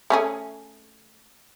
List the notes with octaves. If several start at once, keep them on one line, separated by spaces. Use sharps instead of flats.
A3 C#4 G#4